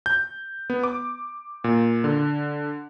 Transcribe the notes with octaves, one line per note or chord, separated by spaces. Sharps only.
G6
B3
D6
A#2
D3